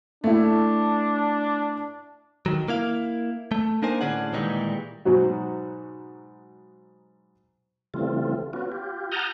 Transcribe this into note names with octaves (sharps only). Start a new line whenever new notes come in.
A3 D4 E4
D#3 F#3
A#3 E4 F5
A3
A#3 D4 D#4 A#4 C5 G#5
A2 D3 C#4 D4 G#4 F#5
A#2 D#3 E3 G3 G#3 D#4
G#2 B2 F#3 D#4 F#4
C#3 E3 G3 A3 C4 F4
B3 C#4 F4 F#4
F4 G4
F#5 A5 A#5 D#6 F6 G6